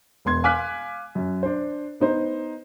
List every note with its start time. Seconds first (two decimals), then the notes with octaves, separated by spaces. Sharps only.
0.25 E1 B3 C6 G#6
0.44 F5 G#5 D6 F6 F#6 B6
1.15 F#2
1.43 D4 C5
2.00 B3 D#4 C5